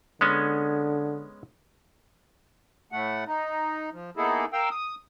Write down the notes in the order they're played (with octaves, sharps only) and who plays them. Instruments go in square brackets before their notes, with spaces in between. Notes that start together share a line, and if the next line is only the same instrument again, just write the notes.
[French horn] D3 [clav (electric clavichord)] G#3 B3 C#4
[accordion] A2 A3 F#5
D#4
F3
A#3 B3 D#4 E4 G#4 A4
A#4 F5 G5 E6
D#6